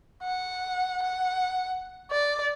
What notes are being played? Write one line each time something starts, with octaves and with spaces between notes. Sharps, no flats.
F#5
F#5
D5